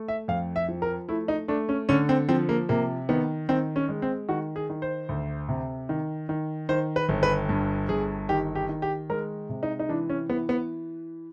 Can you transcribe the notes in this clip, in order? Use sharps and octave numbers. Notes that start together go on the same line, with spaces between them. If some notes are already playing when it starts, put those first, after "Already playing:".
Already playing: A3
E5
F2 F5
E5
F3
A#4
A3 E4
D#4
A3 D4
C#4
D3 C#4
C4
F3 C4
A#3
C3 A#3
D#3 B3
D#3 C4
C#4
G#3
C4
D#3 F#4
G#4
D#3
C5
D2
C3
D#3
D#3
D#3 C5
B4
G1
B4
G2
G1 G#4
D#3 G4
G4
D#3
G4
G#3 A#4
C3
D#4
D#4
E3 D4
C#4
E3 B3
B3